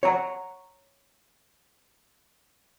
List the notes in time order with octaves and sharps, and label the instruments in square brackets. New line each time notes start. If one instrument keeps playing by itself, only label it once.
[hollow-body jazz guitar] C#5 F#5 A#5